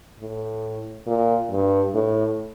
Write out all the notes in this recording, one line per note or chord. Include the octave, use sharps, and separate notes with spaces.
A2
A#2
G2
A2